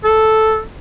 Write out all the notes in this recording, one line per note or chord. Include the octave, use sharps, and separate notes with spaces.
A4